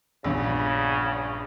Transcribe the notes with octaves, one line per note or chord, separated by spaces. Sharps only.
A#1 E2 G2 C#3